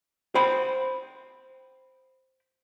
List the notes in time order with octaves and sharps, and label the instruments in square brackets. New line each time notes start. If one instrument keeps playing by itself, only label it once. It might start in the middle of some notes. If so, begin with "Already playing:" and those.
[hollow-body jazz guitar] C5 G5 B5